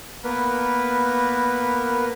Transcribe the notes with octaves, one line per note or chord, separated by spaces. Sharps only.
A#3 B3 A#4 B4